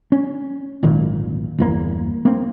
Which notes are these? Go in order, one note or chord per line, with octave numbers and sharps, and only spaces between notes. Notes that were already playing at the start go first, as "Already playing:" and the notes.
C#4
D1 G#1 A#2 D#3
G1 E2 A#3
A#3 C4